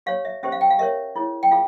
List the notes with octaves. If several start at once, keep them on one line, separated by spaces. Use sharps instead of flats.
G4 C#5 F5
E5
C#4 G4 C5 E5
F5
G5
F5
G4 A#4 C#5 E5
E4 G#4 C#5
G5
F4 G#4 F5